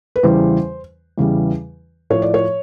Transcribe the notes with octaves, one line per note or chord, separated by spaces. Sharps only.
B4
E2 C#3 E3 G3 C5
E2 C#3 E3 G3
A2 F3 C#5
D5
C#5